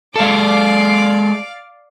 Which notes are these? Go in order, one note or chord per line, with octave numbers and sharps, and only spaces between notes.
G#3 A4 D5 F5 D6